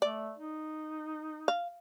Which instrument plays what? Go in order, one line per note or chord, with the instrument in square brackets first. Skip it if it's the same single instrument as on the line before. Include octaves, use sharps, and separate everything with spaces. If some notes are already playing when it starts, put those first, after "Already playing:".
[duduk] A3 [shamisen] D5
[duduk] D#4
[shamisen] F5